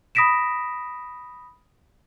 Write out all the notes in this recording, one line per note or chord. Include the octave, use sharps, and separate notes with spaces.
B5 D#6 A#6 B6 D7 E7